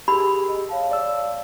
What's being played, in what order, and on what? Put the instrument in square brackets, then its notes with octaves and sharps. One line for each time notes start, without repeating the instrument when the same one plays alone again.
[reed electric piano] G4 G#4 [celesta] A#4 E6 [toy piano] B5
[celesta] D#5
C#5 F5 A5
[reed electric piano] D5 E6